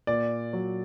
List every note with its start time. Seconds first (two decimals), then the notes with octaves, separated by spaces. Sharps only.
0.07 A#2 D5
0.53 F#3